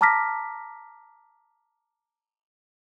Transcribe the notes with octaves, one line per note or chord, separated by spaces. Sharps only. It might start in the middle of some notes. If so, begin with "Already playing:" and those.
A5 A#5 D6 F6 A#6 B6